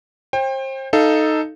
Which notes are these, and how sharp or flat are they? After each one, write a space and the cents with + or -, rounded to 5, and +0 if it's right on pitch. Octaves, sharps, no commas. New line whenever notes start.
C5 +35 G5 +25
D#4 +0 A4 +0 F5 -20